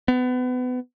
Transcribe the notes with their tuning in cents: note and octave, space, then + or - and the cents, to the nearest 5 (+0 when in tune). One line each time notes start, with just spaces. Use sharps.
B3 +30